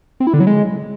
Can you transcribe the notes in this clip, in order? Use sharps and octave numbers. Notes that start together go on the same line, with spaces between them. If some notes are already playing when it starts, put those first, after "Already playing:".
C4
E4
D3
F#3
G#3